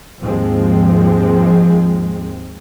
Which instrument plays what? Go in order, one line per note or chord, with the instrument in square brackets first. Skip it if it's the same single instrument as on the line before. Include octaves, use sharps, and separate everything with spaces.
[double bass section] D#2 G#2 F3 G#3 C4